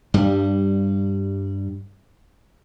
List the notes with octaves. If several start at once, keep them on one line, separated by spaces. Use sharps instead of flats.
G2 G3